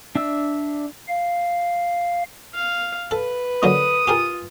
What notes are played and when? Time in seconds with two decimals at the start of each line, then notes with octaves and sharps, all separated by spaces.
0.15 D4 E5 E6
1.08 F5
2.54 F5
3.11 A4 B4
3.63 A#2 D3 F#3 D#6
4.07 F4 G4 G#4 A#4